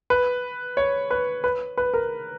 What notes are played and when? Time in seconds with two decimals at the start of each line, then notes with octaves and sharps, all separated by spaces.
0.10 B4
0.77 C#5
1.11 B4
1.44 B4
1.78 B4
1.94 A#4